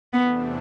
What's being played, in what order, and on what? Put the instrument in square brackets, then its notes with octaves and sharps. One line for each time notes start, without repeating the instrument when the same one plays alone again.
[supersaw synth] E2 C3 E3 A3 D4 [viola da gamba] B3